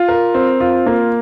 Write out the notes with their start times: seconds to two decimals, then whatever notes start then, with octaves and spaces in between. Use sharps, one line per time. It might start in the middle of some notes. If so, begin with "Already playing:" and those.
Already playing: F4
0.08 A#4
0.34 C4
0.60 F4
0.86 A#3